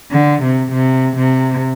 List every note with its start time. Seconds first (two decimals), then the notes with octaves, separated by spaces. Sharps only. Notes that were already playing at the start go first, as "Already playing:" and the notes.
0.12 D3
0.42 C3
0.72 C3
1.17 C3